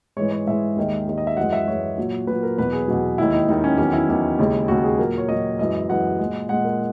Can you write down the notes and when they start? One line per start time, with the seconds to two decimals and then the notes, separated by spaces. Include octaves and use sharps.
0.17 G#2 E3 G#3 C#5
0.32 C#5
0.47 G#2 E3 G#3 E5
0.76 D#2 D#3 G#3
1.07 D#2 D#3 G#3
1.18 D#5
1.27 E5
1.37 F#2 E3 G#3 F#5
1.53 E5
1.67 F#2 E3 G#3 C#5
1.98 A#2 F#3
2.27 A#2 F#3 B4
2.43 A#4
2.58 E2 B2 F#3 B4
2.73 G#4
2.88 E2 B2 F#3
3.18 D#2 D#3 G#3 E4
3.33 D#4
3.48 D#2 D#3 G#3 D#4
3.64 C#4
3.78 E2 D#3 F#3 C#4
3.93 E4
4.09 E2 D#3 F#3
4.39 D#2 C#3 G#3
4.68 D#2 C#3 G#3 F#4
4.84 G#4
4.99 A#2 F#3 A#4
5.18 C#5
5.29 A#2 F#3 D#5
5.59 F#2 E3 G#3 D#5
5.89 F#2 E3 G#3 F#5
6.19 A#2 G#3
6.49 A#2 G#3 F#5
6.64 A#4